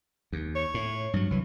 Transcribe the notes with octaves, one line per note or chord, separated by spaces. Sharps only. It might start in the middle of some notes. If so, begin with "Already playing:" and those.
D#2
C#5
A2
G2 F#3
C2 E3 F#3